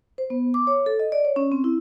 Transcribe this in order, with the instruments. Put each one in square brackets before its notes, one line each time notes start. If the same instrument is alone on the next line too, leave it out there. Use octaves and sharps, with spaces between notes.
[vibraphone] C5
B3
D6
C#5
A4
D#5
D5
C#5
C#4
C4
E4